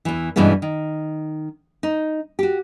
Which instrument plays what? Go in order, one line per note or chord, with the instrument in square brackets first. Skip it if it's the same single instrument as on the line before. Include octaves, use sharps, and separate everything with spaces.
[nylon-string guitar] E2 E3
G2 B2 E3 G#3 B3 C#4
D#3
D#4
F#4 G4